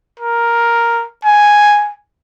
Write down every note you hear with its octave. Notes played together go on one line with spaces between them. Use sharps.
A#4
G#5